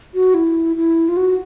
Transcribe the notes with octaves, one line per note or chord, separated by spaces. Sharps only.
F#4
E4
E4
F4
F#4